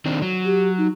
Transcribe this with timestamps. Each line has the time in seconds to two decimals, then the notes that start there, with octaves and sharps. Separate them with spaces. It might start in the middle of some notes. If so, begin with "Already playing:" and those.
0.05 D#3 C4 D4
0.22 F#3
0.45 G4
0.78 D#4